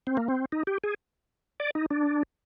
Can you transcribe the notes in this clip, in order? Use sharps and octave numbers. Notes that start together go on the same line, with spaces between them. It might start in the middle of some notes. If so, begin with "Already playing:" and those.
C4
A#3
C4
D#4
G4
G#4
D5
D#4
D4